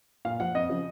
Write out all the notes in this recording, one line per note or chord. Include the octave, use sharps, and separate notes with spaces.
A#2 F5
F3 F#5
F2 D#5
C#3 F3